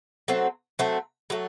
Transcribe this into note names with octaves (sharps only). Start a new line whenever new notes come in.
F#3 A3 C4
F#3 A3 C4
F#3 A3